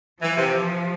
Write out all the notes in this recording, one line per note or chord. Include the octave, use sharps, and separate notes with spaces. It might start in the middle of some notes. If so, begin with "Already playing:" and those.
E3 F3
C3